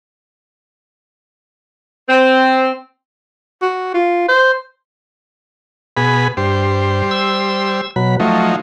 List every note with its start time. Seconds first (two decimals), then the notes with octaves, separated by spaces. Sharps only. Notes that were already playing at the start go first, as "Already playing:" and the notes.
2.09 C4
3.62 F#4
3.94 F4
4.28 C5
5.97 B2 G#4 B5
6.37 G2 G3 C5
7.11 E6
7.96 B2 F#3 B5
8.20 F3 F#3 A3 D#4